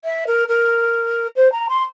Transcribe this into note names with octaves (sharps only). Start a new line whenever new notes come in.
E5
A#4
A#4
C5
A#5
C6